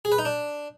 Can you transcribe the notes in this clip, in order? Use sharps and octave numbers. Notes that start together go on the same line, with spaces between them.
G#4
B4
D#4
D4